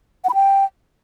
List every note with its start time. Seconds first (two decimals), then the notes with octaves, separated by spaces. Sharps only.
0.24 F#5
0.29 B5
0.34 G5